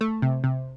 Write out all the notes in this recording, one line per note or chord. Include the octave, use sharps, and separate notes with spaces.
A3
C3
C3